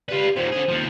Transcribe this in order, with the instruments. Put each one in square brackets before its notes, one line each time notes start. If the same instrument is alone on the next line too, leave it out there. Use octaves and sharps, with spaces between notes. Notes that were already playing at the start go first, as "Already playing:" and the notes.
[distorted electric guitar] F4 B4 [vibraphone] G4 D5
[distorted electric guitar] D#2 A#2 [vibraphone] C5
[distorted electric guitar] D3 G#4
D#2 F3